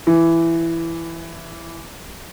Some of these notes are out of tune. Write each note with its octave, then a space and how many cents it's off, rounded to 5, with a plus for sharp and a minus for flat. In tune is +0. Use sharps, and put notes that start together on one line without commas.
E3 +10